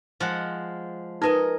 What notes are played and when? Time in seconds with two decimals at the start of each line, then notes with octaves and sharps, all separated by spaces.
0.20 F3 G#3 F#5
1.22 D#4 A#4 B4 D#5 G#5